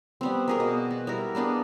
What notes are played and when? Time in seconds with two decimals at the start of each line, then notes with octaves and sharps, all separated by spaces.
0.21 G3 B3 C4
0.48 A#3 G#4 A#4
0.60 B2
0.91 F#4
1.07 G3 E4 A#4
1.35 A#3 B3 D4 G#4